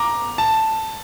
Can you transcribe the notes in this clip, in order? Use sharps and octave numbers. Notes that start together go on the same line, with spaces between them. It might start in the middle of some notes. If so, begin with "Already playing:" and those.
Already playing: A#5 D6
A5